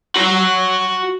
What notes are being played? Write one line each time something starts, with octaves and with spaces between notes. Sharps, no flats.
F#4 A#5